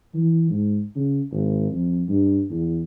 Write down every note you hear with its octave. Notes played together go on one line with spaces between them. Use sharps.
E3
G#2
C#3
G#1
F2
G2
E2